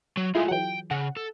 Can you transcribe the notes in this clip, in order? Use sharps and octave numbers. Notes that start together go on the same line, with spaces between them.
F#3
G#3 A3 E4 F4 G#4
E3 F#3 F#5 G5
C#3 F#5
A4